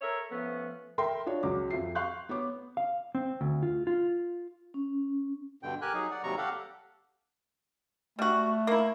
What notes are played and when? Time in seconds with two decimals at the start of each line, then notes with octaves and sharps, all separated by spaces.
0.01 A4 A#4 C#5 E5
0.31 F3 A3 B3 C#4
0.98 A4 A#4 E5 G5 C6
1.26 D4 F4 C#5
1.43 C#2 F#3 F#4 D6
1.70 F2 F4 E5 C7
1.95 F5 C6 C#6 F#6 G6
2.29 B3 C#5 D6
2.77 F5
3.15 C4
3.41 D2
3.63 F4
3.87 F4
4.74 C#4
5.63 G2 B2 D3 G5
5.82 G4 A#4 G#5 F#6
5.94 F#3 D#4 G#4
6.11 D5 F#5
6.23 D#2 C3 F#3 G3 A#5 C#6
6.38 G4 A4 F5 F#5
8.19 G3 A3 F#4
8.67 A#3 E4